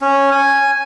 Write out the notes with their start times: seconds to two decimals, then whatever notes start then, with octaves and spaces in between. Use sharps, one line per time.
0.02 C#4
0.32 G#5